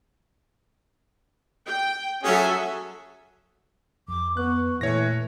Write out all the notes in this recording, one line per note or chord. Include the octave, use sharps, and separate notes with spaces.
G5
F#3 C#4 F#4 G#4 A4 E5
F2 D6
B3 C#6 F#6
A#2 E3 A3 B4 C#5 A#6